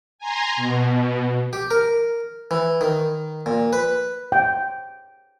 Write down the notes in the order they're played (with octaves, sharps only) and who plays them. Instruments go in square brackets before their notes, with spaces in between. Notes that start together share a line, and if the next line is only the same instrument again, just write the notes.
[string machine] G#5 A#5 C6
B2
[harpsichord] G4
A#4
E3
D#3
A#2
B4
[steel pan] G5